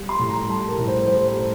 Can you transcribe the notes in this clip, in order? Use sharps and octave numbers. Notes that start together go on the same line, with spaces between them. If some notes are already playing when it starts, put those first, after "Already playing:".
Already playing: G3
C6
A2
A#5
G3 A5
A#4
A2
C5
G3 C5
C5
A2